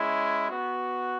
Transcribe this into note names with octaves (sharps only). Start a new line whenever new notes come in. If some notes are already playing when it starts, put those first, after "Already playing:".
Already playing: G#3 C#4 E4
B3 F#4